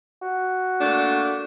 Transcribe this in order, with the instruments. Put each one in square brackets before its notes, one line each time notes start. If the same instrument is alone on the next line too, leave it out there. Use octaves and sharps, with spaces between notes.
[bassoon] F#4
[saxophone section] A3 A#3 D4